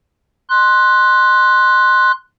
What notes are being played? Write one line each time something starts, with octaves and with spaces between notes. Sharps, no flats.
C6 F#6